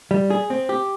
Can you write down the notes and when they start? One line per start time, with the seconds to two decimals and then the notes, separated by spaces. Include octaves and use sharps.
0.11 G3
0.30 G#4
0.50 C4
0.69 G4